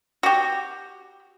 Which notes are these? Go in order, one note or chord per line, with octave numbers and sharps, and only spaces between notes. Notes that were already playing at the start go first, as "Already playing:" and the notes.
F#4 G4